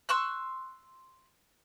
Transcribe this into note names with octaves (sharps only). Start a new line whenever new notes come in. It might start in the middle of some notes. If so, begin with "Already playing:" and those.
C6 C#6 E6 F#6